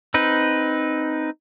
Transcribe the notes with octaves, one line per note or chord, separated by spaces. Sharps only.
C4 D#4 B4